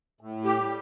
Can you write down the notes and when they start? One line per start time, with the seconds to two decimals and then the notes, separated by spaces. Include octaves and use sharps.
0.21 A2
0.45 G4
0.58 G3